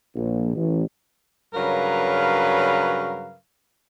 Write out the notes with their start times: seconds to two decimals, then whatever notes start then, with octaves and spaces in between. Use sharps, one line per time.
0.15 A#1
0.55 A1
1.54 G2 C#3 F#3 A#4 B4 F5